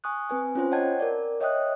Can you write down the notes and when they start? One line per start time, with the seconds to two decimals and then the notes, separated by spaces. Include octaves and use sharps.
0.04 G#5 C#6 D#6 F#6
0.30 C4 B4 G#5
0.55 C#4 F4 C5
0.72 C#5 D#5 F#5 G5 A5 G#6
1.00 A#4 D5
1.40 C#5 D#5 E5 G5 D#6 F#6